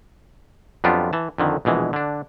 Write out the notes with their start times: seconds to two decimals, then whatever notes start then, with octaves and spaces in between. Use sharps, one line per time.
0.84 F2 F#3 B3 D4 F4 G4
1.13 E3 A5
1.38 F2 D3 D#3
1.65 A#1 B2 E3 G#3
1.93 D3 D4